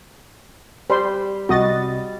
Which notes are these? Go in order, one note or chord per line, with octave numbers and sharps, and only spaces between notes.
G3 C5 D5 B5 C6
C2 F#4 D#5 A6